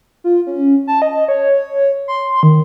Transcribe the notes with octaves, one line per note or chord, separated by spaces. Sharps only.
F4
C#4
A5
D#5
C#5
C6
D#3